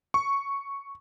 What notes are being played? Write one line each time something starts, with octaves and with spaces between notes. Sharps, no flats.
C#6